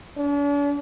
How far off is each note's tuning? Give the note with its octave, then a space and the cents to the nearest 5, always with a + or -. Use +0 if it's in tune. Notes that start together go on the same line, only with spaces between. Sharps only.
D4 -45